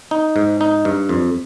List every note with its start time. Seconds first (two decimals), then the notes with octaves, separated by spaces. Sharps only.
0.11 D#4
0.36 G#2
0.61 D#4
0.85 G2
1.09 F2